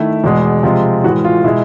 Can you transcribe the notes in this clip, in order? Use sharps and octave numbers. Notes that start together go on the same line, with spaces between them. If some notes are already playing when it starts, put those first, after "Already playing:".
Already playing: D#3 A3 E4
E2 B2 G#3
C3 F3 G#3 F4
A2 E3 G#3 F#4
F4
B2 G#3 E4